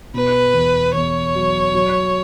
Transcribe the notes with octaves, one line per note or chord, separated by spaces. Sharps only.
B2 B4
E2
E2 C#5
F#3
F#3